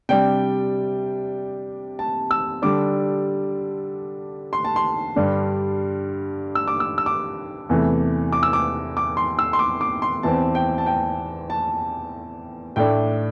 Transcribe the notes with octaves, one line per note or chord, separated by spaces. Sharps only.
C3 G3 D4 G5
A5
E6
D3 G3 D4 D6
C6
A5
C6
G2 D3 G3 D4
E6
D6
E6
E6
D6
E2 C3 E3 A3
D6
E6
D6
D6
C6
E6
C6
D6
D6
C6
E2 E3 C4 A5
G5
A5
G5
A5
A2 A3 D4 G5